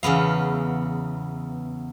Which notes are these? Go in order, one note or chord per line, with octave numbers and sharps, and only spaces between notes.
E2 C#3 B3 F5